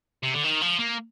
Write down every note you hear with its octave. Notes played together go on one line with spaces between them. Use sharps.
C3
D3
D#3
F3
A#3